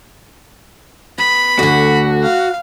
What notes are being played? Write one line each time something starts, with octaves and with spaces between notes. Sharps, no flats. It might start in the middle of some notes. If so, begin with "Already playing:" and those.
B3 B5
D2 D3 F#4
F5